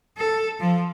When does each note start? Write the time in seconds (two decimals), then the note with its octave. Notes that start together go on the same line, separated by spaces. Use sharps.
0.17 A4
0.60 F3